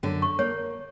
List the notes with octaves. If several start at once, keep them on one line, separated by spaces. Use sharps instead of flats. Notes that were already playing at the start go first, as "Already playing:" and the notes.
F#2 D3
C#6
A#3 C#5